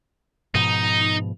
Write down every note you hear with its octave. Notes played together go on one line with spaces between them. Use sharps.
G#2 B2 F3 D#4